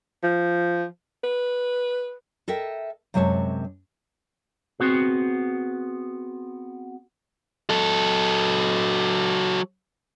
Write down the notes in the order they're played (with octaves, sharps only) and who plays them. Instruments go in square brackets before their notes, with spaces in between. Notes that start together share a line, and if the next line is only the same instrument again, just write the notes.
[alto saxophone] F3
B4
[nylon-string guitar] A4 A#4 D#5 E5 G5
F#2 C3 G#3 C#5 A5
[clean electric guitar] B3 C4 F#4 G#4
[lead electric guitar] F#3 A4